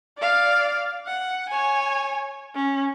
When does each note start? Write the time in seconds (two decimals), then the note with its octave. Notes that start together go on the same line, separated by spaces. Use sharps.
0.17 D5 F5
1.07 F#5
1.49 C#5 G#5
2.55 C#4